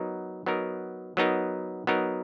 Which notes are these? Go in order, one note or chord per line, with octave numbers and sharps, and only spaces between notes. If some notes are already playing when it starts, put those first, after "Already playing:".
Already playing: F#3 B3 D#4 A#4
F#3 B3 D#4 A#4
F#3 B3 D#4 A#4
F#3 B3 D#4 A#4